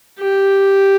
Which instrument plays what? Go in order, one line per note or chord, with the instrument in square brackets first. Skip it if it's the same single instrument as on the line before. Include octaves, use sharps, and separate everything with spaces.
[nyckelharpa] G4